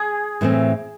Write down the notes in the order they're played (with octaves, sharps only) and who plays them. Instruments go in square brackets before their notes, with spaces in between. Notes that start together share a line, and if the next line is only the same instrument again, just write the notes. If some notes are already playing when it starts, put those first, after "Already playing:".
Already playing: [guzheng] G#4
[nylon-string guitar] A2 E3 A3 C4